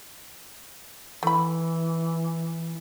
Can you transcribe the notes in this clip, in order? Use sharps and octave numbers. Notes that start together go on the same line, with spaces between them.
E3 A3 B5